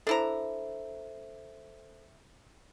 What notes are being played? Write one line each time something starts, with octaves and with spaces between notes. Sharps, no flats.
D4 E4 A4 C5 A#5